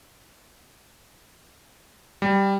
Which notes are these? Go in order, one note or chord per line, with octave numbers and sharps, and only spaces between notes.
G3